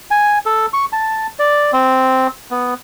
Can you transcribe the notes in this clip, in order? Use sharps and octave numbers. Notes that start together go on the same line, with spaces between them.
G#5
A4
C#6
A5
D5
C4
B3